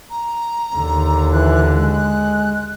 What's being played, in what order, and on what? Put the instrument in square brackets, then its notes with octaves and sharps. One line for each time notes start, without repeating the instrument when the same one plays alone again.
[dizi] A#5
[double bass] D#2 D3
[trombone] E3 [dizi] F#6
[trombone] G#3 [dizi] F#6